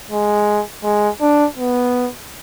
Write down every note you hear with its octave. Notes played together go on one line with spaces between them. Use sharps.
G#3
G#3
D4
B3